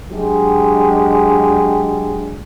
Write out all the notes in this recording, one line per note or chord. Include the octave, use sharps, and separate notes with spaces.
F#3 G#3 D4 G4